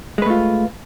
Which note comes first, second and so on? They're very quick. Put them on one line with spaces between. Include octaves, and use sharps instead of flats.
G#3 B4 A3 F4